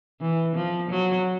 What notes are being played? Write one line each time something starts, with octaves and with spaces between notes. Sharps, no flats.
E3
F3
F#3